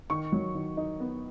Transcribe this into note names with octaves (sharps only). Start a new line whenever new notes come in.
D#3 C#6
F#3
D#3
D#4
B3